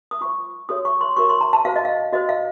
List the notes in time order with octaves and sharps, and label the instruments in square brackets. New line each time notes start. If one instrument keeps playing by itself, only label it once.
[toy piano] D#6
F4 C5 C#6
F#4 A4 C#5 D#6
C#6
C6
F#4 A#4 C#5 C#6
C6
A#5
A5
F#4 C5 F5
D#5
F5
F#4 C5 D#5
F5